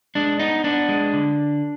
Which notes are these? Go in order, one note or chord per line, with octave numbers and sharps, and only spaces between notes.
G#3 D4
B3 D#4
B3 D4
G#3
D3